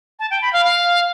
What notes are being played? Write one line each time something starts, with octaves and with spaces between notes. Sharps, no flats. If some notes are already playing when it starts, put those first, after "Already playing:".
A5
G5
B5
F5
F5